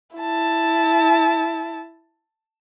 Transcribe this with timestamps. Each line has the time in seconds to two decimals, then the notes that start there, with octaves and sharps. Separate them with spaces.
0.16 E4 A5